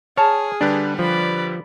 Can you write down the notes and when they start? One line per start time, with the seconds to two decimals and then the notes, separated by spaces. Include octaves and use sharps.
0.17 G#4 C#5 D5 A5 A#5 F6
0.61 D3 G3 D4 G4 B4
0.99 F3 D5 B5